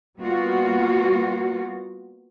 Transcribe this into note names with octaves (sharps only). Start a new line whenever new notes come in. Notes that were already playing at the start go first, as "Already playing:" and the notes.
G3 A#3 B3 F4 F#4